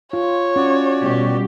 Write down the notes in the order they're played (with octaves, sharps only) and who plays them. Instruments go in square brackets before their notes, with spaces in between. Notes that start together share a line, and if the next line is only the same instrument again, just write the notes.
[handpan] F4 [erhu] C#5
[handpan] C#4 [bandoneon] F#4 D5
[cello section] B2 G3 G4